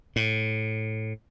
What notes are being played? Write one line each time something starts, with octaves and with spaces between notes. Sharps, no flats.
A2